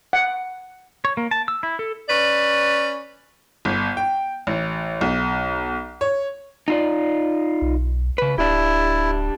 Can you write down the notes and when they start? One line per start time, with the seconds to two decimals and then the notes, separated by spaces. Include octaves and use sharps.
0.13 F#5
1.05 C#5
1.17 A#3
1.31 A5
1.48 E6
1.63 E4
1.79 A4
2.09 C#4 B4 D5
3.65 G1
3.97 G5
4.47 A1
5.01 B1
6.01 C#5
6.68 D#4 F4 D5
7.62 B1
8.18 C#3 B4
8.38 D1 D4 E4 G4